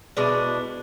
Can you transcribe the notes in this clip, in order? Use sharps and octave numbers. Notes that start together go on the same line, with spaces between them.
B2 G#3 D4 E4